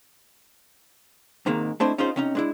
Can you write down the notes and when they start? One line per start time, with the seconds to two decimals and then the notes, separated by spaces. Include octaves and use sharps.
1.46 G#2 C3 D#3 G#3 A#3
1.80 A3 C4 D4 E4 C5 D#5
1.98 C#4 D#4 F4 G#4 C5
2.16 C3 C#4 D#4
2.35 G#3 D4 E4